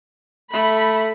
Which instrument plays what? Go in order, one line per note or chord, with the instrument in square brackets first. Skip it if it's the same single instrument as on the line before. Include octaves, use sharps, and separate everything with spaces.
[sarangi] A3 [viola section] B5